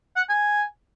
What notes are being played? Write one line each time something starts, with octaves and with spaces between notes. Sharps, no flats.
F#5
G#5